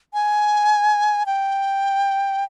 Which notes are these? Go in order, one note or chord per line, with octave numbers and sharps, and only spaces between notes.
G#5
G5